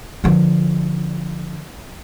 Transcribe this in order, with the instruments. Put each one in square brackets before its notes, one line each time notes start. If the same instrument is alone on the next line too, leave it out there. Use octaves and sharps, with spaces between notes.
[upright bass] D3 F3